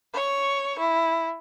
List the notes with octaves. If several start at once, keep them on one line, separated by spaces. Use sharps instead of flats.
C#5 C#6
E4